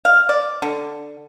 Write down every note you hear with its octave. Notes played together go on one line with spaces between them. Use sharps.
F5
D5
D3